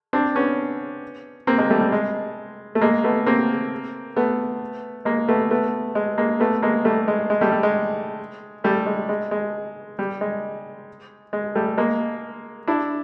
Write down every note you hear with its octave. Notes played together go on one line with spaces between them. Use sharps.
C4 D4
B3 C#4
A#3 C4
G#3 A#3
G3 A3
G3
G#3
A3
G#3 A#3
A3 B3
A#3 C4
A3 B3
G#3 A#3
A3 B3
A3 B3
G#3
G#3 A#3
A3 B3
G#3 A#3
G3 A3
G#3
G#3
G3 A3
G3
G#3
G3 A3
G#3
G#3
G#3
G3
G#3
G#3
G3 A3
G#3 A#3
D4 E4